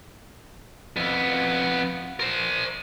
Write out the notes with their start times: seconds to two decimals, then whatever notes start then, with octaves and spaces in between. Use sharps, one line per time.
0.96 F2 B3
2.20 A#4 C5